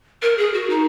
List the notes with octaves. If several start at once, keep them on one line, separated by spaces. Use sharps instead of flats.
A#4
G#4
F#4
D#4